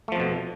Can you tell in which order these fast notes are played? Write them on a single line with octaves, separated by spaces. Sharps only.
A3 F3 F2 B2